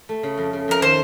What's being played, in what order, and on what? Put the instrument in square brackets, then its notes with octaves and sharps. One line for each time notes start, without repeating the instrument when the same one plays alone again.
[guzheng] A3
C#3
F2
C#3
[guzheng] F2 [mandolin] A#4
[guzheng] D#3 [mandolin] C5